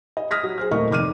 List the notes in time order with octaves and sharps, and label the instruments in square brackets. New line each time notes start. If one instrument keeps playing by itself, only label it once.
[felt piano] D#5
D#6 F6 A#6 B6
F#3
G#4 C5 F6
D#1 A3 A#4 D#5 C#6 F6
F1 D#3 D6 F6 D#7